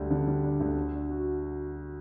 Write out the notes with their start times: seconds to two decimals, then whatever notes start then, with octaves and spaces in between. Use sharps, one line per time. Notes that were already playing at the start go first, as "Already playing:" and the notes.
Already playing: D2 D3 G3 D4
0.10 D3
0.27 G3
0.44 D4
0.60 D2
0.77 A3
0.93 D4
1.10 F#4